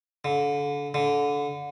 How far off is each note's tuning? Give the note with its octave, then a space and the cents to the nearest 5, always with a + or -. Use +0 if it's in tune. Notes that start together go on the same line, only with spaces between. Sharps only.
D3 -35
D3 -25